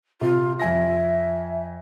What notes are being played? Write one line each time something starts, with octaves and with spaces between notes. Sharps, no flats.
C3 F4
F2 E5 G#5 A#6